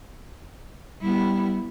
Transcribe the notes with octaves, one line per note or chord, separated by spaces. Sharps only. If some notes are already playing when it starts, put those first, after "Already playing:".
G3 B3 E4